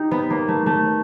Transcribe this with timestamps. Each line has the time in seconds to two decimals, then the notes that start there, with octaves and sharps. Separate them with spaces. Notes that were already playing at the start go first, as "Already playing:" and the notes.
Already playing: D#4 G4
0.11 B3
0.30 A#3
0.48 A3
0.66 A3